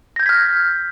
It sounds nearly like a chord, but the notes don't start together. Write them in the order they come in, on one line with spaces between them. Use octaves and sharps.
A#6 G6 G#6 B6 F6